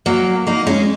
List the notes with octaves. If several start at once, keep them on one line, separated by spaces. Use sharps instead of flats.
F#3 A#3
A#3 D#4
G#3 C#4